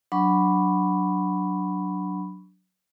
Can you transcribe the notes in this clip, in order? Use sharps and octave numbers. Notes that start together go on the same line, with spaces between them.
F#3 D4 B5 C#6